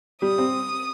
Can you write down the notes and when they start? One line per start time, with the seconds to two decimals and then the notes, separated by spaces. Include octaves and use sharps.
0.22 G3 D#6
0.38 C4